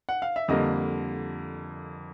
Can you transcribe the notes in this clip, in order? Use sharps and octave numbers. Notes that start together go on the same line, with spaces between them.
F#5
F5
E5
F2 D3 G3 A#3 D#5